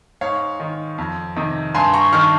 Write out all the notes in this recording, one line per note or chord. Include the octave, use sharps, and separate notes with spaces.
G#2 C#5 F5
D#3
F2
C3 D#3
G2 G#5 C6
A#5 C#6
D#3 C#6 F6